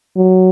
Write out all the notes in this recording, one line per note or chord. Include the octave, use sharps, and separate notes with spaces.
F#3